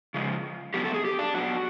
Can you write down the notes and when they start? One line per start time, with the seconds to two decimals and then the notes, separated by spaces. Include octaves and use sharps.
0.14 C#3 F3 G#3
0.74 D3 F#3 B3 G4
0.85 A4
0.94 G#4
1.05 G4
1.19 D4
1.34 A2 F#3 B3 F#4